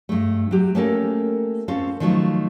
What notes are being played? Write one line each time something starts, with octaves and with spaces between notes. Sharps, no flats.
G2 A3
F#3 G4
A3 A#3 C#4 G4 A4 A#4
C4 C#4 F4 A4
D#3 F3 F#3 A3 F4